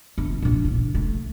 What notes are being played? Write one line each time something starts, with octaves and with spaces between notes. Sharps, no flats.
G1
A#1 E3
C#3
A3